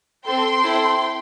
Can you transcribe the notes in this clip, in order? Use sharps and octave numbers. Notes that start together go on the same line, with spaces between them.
C4 A4 G5 C6
C4 E4 A4